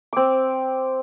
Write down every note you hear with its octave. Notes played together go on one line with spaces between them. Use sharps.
C4 D6